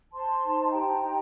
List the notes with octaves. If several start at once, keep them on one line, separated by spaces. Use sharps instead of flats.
C5 A5 C6
D#4
C6
G4 G5 A#5
D#4